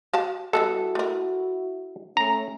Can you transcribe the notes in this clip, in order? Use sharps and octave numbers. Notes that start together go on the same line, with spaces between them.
F#4 F5 A5
G3 G#3 B3 E4 F#4 A4
A3 A#4
A3 C#4 A#5